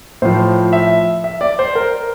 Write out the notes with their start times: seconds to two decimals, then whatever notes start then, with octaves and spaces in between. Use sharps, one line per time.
0.22 A2 F3 C5
0.73 E5
1.24 E5
1.41 D5
1.59 C5
1.75 A#4